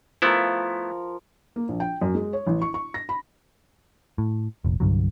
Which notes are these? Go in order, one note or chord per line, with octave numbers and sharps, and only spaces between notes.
F3 A3 B3 E4 A#4
A#3
A#1
G5
F#2
G#3
C#5
A1
C#6
C#6
A#6
B5
A2
F1 A#1
C2 G2 D3 F#3